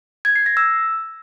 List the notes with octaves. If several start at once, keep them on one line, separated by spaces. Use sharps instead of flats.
G#6
C7
A#6
E6